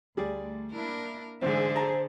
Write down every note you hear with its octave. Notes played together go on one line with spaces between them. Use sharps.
D2 G3 G#4 D5
A#3 D4 E4 A#4
A1 G#2 D3 G#4 C5 E5
A5 A#5